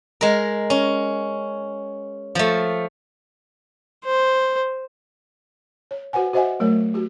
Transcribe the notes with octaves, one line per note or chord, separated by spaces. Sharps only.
G#3 A#4
C#4
F3 A3
C5
C#5
F#4 B4 C5 F#5 G#5
F#4 C5 D#5 E5 F#5 G#5
F#3 A3 A#4 C#5
F#4 G4